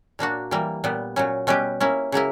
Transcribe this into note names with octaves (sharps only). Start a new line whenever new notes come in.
A#2 A#3 D4 F#4
E3 G3 A#3
A#2 G3 B3
A#2 F#3 C#4
B2 G3 C#4 G4 B4
A#3 C#4 E4
C#3 F#3 A#3 E4